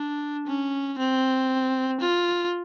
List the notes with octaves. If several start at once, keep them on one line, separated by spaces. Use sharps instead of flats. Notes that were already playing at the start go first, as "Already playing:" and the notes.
Already playing: D4
C#4
C4
F4